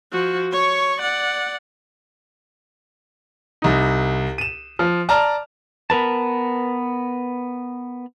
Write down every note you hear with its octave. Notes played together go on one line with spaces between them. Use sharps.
F3 F#4
C#5 C#6
D5 F#5
C2 D#4
D#7 E7
F3
D5 A5 A#5 F6
B3 A#4 B4 A5